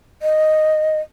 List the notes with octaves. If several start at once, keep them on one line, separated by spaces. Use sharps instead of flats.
D#5